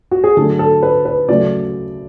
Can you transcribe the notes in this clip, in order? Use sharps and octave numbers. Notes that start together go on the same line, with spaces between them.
F#4
G#4
D3 F#3 A3 A4
A4
B4
B4
C#3 F#3 A3 D5